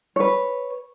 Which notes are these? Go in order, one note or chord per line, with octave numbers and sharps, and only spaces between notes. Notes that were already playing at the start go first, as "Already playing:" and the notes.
B4 C#5